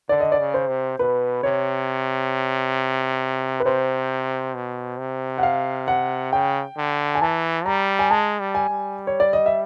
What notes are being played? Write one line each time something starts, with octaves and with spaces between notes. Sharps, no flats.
D3 D5
D#5
D5
C#3
C5
C3
B2 B4
C3 C#5
B4
C3 C5
B2
C3
F#5
F5
F#5
C#3 G5
D3
G#5
E3 A5
G3 A#5
G#5
G#3 A5
G3
G#5
G3
C#5
D5
D#5
E5